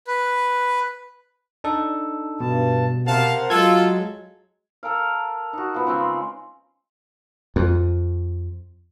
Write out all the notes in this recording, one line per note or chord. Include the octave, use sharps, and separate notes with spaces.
B4
D4 D#4 A4
G2 B2 A5
C3 A#4 C5 F5 F#5 A5
F#3 G#3 F4 A4 G#6
A4 A#4 F5
D#4 F#4
F3 B3
C#3 G#3 C4
F2